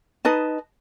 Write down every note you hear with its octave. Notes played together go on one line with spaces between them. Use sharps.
D#4 B4 D#5 A5